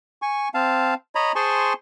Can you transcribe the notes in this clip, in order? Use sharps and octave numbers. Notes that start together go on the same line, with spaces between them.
G#5 C#6
C4 F5 A5
C#5 D#5 A#5 B5
G#4 C5 G#5 A5 C6 C#6